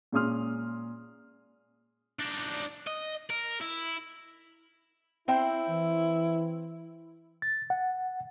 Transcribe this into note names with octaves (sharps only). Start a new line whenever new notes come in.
A#2 G#3 C#4 C6 D#6 F6
D4 D#4
D#5
A#4
E4
C4 E4 C5 G5
E3
A6
F#5